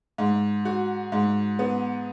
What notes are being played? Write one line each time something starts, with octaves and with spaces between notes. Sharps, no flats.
G#2
F#4
G#2
B3